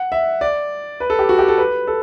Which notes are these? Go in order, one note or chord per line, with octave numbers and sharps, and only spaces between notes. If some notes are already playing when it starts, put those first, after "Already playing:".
Already playing: F#5
E5
D5
B4
A4
G4
F#4
G4
A4
B4
A4